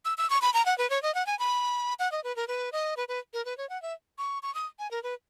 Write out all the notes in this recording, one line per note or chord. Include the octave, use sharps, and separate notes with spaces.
E6
E6
C#6
B5
A#5
F#5
B4
C#5
D#5
F#5
G#5
B5
F#5
D#5
B4
A#4
B4
D#5
B4
B4
A#4
B4
C#5
F#5
E5
C#6
C#6
D#6
G#5
A#4
B4